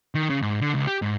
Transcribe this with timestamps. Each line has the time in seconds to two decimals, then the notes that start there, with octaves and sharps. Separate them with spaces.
0.15 D#3
0.30 C#3
0.42 G#2
0.61 D3
0.74 C#2
0.87 G4
1.02 G#2